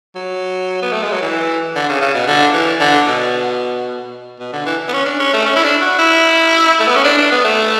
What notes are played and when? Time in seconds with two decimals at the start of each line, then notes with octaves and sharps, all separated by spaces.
0.15 F#3
0.82 B3
0.92 A3
1.02 G#3
1.12 F#3
1.22 E3
1.75 D3
1.89 C#3
2.01 C#3
2.14 B2
2.27 D3
2.54 E3
2.80 D3
3.07 B2
4.40 B2
4.53 D3
4.66 E3
4.88 B3
4.93 C#4
5.05 D4
5.19 C#4
5.33 A3
5.46 C#4
5.56 E4
5.63 D4
5.81 F#4
5.99 E4
6.80 A3
6.88 B3
6.96 C#4
7.04 D4
7.18 D4
7.32 B3
7.44 A3